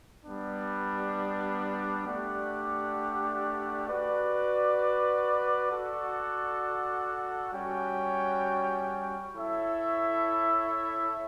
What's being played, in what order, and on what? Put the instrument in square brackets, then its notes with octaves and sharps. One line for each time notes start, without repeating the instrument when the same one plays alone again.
[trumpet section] G3 B3 D4
A3 D4 G4 D5 F#5
F#4 B4 D5
F#4 A4 D5 F#5
G3 C#4 F#4 C#5 G5
E4 A4 C#5 E5